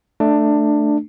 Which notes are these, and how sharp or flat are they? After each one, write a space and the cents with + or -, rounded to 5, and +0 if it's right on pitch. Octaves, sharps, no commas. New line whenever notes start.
A3 +0 D4 +15